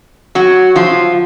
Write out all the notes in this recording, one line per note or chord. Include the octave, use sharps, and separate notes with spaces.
F#3 F#4
F3 F4